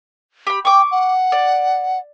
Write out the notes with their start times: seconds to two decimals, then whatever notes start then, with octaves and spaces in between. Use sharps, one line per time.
0.47 G4 B5
0.65 G5 C#6 D6
0.91 F#5
1.32 D5